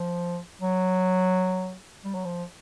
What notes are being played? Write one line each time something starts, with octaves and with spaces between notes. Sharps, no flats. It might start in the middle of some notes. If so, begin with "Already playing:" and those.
Already playing: F3
F#3
G3
F#3
F3